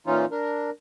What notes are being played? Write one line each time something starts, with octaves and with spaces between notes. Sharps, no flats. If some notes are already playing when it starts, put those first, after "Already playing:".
A#2 E3 C#4 D#4 F4
D4 A#4